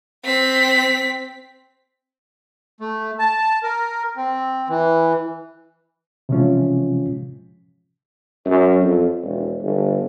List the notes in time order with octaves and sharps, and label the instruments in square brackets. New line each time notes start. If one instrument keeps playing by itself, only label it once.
[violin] C4 B6
[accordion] A3
A5
A#4
C4
E3
[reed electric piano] C3 E3 F3 G#3 C#4 F4
[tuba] F#2
F2
E1
G1